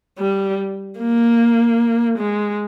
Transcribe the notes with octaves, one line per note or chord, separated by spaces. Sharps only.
G3
A#3
G#3